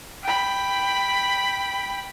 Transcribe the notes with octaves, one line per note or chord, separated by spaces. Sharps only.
G5 B5